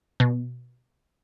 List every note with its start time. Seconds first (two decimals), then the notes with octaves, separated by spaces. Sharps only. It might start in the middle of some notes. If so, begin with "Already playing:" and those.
0.20 B2